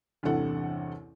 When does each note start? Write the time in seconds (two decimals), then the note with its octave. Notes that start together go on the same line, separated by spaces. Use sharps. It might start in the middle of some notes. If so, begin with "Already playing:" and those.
0.23 A1 E2 G2 C3 A4 F#5